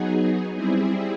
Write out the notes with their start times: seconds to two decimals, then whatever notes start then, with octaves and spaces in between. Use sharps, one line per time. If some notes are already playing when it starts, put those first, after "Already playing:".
Already playing: F#3 B3 D#4 G#4
0.54 G3 C4 E4 G#4